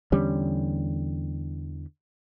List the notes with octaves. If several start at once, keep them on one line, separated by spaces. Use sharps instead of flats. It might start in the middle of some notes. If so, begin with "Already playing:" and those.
E2 D3 G3 C#4